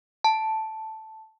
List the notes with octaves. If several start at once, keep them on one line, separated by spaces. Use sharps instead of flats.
A5